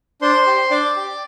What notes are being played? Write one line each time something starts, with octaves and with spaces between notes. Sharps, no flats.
D4 C5 C6
G4
D4 D5 D6
G4